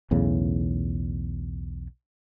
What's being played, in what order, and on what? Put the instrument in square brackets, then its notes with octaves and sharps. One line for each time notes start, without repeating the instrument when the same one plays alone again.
[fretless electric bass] B1 E2 A2 C#3